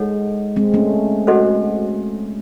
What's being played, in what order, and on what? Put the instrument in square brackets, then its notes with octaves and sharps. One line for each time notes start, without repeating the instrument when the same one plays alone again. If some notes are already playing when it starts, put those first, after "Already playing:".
Already playing: [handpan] G#3 [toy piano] D#4 A4 C#5 F#5
[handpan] G#3 C4
A3 C#4
[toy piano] F#4 A4 C5 D#5 F#5